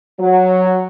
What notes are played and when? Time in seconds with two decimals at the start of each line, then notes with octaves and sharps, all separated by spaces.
0.20 F#3